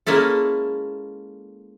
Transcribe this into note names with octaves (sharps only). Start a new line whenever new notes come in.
G#3 A#3 C#4 E4 A4